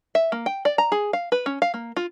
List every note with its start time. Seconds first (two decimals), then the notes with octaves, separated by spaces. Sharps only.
0.15 E5
0.32 A#3
0.46 G5
0.65 D5
0.78 A#5
0.92 G#4
1.13 F5
1.32 B4
1.46 C#4
1.62 F5
1.74 A#3
1.97 F4